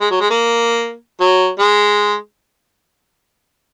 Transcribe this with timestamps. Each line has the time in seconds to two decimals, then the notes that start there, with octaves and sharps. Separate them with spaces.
0.01 G#3
0.10 F#3
0.21 G#3
0.30 A#3
1.20 F#3
1.59 G#3